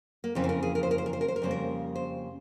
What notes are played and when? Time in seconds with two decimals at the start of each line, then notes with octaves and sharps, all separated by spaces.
0.24 A#3
0.35 F2 C#3 E3 A#3 C4
0.44 C5
0.49 A#4
0.63 G#4
0.75 A#4
0.83 C5
0.91 A#4
0.98 C5
1.06 A#4
1.13 C5
1.21 A#4
1.28 C5
1.36 A#4
1.42 F2 C#3 G3 A#3 C5
1.51 A#4
1.96 C5